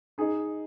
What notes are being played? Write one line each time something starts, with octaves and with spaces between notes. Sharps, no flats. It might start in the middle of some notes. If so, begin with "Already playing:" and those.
D#4 G#4